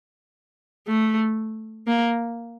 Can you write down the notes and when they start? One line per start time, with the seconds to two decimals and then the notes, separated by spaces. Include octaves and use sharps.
0.87 A3
1.87 A#3